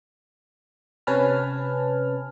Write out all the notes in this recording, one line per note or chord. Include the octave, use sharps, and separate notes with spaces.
C3 C#4 B4 G#5 A5 F6